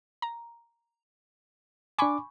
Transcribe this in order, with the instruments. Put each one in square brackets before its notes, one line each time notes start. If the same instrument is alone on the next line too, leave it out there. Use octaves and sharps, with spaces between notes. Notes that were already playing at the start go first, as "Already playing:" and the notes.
[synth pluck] A#5
[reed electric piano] D4 D6 [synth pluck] G#5 B5 C#6